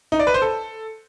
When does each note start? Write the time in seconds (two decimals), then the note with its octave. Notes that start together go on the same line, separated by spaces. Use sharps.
0.12 D#4
0.19 D5
0.27 B4
0.34 C5
0.42 A4